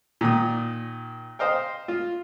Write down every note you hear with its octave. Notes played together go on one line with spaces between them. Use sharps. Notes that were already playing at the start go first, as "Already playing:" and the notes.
A#2 D#3 D#6
C5 D#5 F5 G5
F4